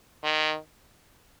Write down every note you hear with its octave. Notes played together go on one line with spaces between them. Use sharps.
D#3